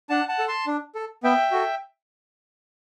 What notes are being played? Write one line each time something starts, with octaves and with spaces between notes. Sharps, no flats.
D4 F#5 A5
F#5 A5
A4
A5 C6
D4
A4
B3 E5 G5
F#4 A4